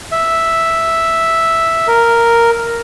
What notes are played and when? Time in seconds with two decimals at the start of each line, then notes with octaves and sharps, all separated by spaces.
0.12 E5
1.88 A#4